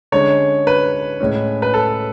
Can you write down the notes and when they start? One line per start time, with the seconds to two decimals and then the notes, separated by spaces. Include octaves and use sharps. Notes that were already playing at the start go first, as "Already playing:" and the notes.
0.12 D3 G#3 C#4 C#5
0.67 B4
1.20 A2 G#3 C#4
1.62 B4
1.74 A4